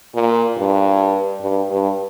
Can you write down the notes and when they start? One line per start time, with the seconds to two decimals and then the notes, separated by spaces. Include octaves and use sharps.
0.15 A#2
0.58 G2
1.41 G2
1.70 G2